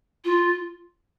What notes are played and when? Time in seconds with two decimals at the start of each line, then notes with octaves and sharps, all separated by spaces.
0.25 F4